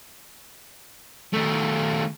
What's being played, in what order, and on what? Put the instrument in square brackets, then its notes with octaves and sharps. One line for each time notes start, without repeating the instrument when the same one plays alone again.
[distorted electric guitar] D#3 A3